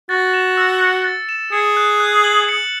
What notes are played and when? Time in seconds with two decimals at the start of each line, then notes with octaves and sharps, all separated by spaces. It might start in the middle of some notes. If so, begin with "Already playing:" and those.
0.09 F#4 A6
0.34 E7
0.57 E6
0.81 C#7
1.04 A6
1.29 E7
1.52 G#4 C#7
1.77 F#6
2.00 F#6
2.24 F#7
2.49 C#7